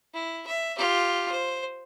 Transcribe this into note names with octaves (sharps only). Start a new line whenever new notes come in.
E4
E5
F4 G4
C5